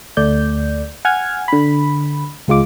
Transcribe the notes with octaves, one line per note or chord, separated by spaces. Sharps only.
D2 A3 D5 G6
F#5 G#5 F6 G#6
D3 B5
C#2 G#3 F4 D6